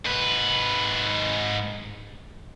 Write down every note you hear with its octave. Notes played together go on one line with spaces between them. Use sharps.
G#2 B4